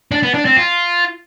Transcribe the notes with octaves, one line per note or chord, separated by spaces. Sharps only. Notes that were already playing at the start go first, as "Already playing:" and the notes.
D4
B3
D4
C4
F4